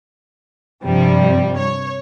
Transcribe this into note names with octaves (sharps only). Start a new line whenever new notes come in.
G2 C3 F3 G3
C#5